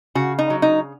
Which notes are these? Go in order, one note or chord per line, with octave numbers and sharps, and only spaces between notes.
C#3 F#4
D#4
F#3
D#4